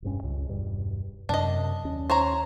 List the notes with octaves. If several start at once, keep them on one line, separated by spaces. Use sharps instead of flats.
E1 G2 C#4
C#2
E1 G2 G3
F#2 C3 D4 D#5
D#2 C#4
C5 C#5 A#5